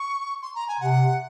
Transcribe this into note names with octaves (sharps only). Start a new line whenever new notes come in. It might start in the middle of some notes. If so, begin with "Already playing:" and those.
Already playing: C#6
C6
A#5
G#5
C3 F#5